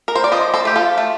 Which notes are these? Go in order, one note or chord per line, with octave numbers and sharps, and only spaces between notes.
A#4
C5
D5
F3 C5 D#5
A4 C5
A3 G4
F4 A4
A3